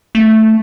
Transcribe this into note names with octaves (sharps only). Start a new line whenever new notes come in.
A3